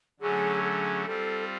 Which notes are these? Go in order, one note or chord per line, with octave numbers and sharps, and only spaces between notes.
D3 F#3 A3 C#4 G#4
G#4
G3 C4 F4 A4